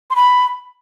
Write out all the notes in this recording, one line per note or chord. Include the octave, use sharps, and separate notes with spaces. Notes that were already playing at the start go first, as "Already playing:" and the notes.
C6
B5